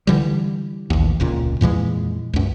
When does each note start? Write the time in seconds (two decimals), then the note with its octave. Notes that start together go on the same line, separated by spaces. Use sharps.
0.07 D3 E3 G3
0.90 A1 D#2
1.20 E1 C#2 A#2
1.61 F2 A#2 E3 G#3
2.33 C#2 F#2